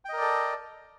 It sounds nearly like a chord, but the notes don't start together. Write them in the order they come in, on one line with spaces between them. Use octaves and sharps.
G5 D#5 A#4 D5 A4